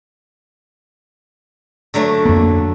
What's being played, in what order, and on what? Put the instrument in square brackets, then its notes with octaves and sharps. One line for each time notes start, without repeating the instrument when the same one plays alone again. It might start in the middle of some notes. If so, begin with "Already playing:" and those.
[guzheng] D3 F#3 A3
[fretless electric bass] F2 A#3